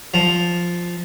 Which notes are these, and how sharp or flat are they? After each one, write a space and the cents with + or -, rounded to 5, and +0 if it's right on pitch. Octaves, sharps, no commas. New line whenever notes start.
F3 +0 A#5 +0